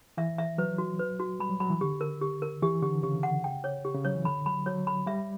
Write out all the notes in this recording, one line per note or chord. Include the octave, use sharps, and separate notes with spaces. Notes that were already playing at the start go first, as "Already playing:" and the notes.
E3 E5
E5
F#3 B4
F#4
B4
F#4
G3 B5
F#3
F#3 B5
E3
D3 G4
A#4
G4
A#4
E3 G4
D3 G4
C#3 G4
F#5
G5
C#5
G4
C#3
F#3 C#5
E3
D3 B5
F#3 B5
F#3 C#5
B5
G3 E5